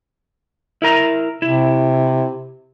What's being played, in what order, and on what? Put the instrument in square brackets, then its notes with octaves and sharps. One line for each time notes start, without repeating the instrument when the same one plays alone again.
[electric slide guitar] E4 A#4 A#5
[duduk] C3 [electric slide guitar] E4